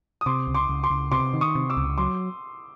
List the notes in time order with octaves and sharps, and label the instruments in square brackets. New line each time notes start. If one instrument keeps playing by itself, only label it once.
[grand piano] D#6
[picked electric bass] C3 [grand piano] C6 D6
[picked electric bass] C#2
[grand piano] C6 D6
[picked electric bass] C#2
[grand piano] C6 D6
[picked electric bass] C#2
[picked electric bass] C3 [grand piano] C6 D6
[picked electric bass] D#3
[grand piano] C#6 D#6
[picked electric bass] C3
[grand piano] D6 E6
[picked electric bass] C#2
[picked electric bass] F#3 [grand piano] C6 D6